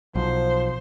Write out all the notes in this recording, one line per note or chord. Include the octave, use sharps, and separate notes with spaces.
B1 F3 C5